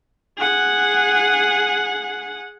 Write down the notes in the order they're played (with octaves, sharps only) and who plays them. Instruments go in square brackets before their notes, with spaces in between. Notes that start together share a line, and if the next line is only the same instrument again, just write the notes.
[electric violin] G#4 F#5